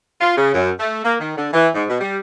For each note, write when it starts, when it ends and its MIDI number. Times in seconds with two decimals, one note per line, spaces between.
0.21 0.35 65
0.38 0.54 49
0.54 0.71 42
0.80 1.05 57
1.05 1.15 58
1.20 1.37 51
1.37 1.50 50
1.53 1.69 52
1.75 1.85 44
1.89 2.00 47
2.01 2.18 55